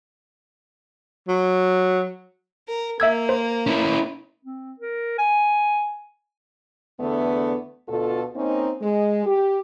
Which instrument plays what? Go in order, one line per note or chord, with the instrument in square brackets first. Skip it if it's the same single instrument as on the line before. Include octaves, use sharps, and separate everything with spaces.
[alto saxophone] F#3
[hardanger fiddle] A#4
[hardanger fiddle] A#3 [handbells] E5 E6 G#6
[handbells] C5
[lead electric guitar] C#4 E4
[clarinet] C4
A#4
G#5
[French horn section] E2 D3 A3 B3
D2 B2 F4 A4
A#3 C4 C#4 D#4
G#3
G4